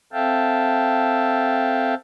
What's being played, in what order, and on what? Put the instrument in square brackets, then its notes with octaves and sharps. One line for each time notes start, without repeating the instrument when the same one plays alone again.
[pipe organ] C4 A4 E5 F5 G5 A5